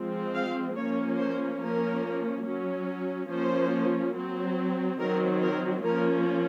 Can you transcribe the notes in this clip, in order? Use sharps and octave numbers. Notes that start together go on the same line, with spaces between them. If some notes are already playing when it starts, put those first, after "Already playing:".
Already playing: F3 G#3 C4
F5
F3 A#3 C#4 C#5
C5
F3 A#3 C#4 A#4
F#3 C#4
F3 A#3 C#4 C5
F#3 C4
D#3 F#3 C4 A#4
A#4
F3 A#3 C#4 A#4